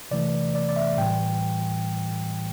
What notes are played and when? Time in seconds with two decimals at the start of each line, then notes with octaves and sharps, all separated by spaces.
0.11 C3 E3 A3 D5
0.55 D5
0.69 D5
0.76 E5
0.97 A2 E3 G3 G5